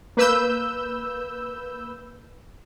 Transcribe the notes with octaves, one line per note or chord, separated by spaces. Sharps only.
A#3 B4 E6 G6